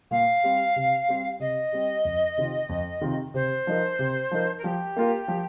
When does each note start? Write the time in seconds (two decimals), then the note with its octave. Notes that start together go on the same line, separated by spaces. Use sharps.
0.11 A#2 F5
0.44 G3 C4
0.76 C3
1.08 G3 C4 G4
1.40 C3 D#5
1.72 G3 C4 G4
2.05 F2
2.38 C3 D#3 C4 F4
2.69 F2
3.02 C3 D#3 C4 F4
3.34 C3 C5
3.67 F3 D#4 A#4
3.99 C3
4.31 F3 D#4 A#4
4.57 A#4
4.64 F3 G4
4.96 A#3 F4 A#4
5.28 F3